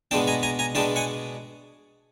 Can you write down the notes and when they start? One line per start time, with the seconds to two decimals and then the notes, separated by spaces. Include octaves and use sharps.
0.11 B2 G#3 B3 D4 G5 A5
0.27 G#5 A#5
0.43 G#5 A#5
0.59 G#5 A#5
0.75 B2 G#3 B3 D4 G5 A5
0.96 F#5 G#5